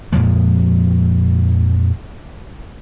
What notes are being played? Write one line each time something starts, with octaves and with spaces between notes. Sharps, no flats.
F2 A#2 F3 G#3